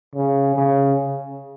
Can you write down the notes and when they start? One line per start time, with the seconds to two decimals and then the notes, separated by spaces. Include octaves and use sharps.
0.14 C#3
0.56 C#3